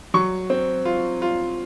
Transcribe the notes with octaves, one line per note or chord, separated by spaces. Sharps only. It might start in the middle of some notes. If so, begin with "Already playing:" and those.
F#3 C#6
C4
F4
F4